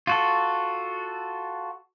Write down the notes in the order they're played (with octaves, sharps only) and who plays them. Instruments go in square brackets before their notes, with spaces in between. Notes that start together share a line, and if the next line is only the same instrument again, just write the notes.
[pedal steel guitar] F4 F#4 A4